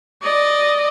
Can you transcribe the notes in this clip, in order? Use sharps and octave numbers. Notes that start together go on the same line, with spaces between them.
D5 D#5